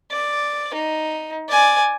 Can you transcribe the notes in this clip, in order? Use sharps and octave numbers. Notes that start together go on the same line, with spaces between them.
D5
D#4
D5 G#5